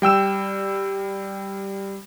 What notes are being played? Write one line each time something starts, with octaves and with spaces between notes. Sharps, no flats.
G3 G5 E6 E7